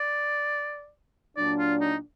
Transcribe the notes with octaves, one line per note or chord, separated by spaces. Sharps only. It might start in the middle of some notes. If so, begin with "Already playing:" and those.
Already playing: D5
A#2 F#3 D4 D5
F4
D#4